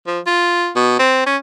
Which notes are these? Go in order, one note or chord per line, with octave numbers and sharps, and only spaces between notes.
F3
F4
B2
C4
C#4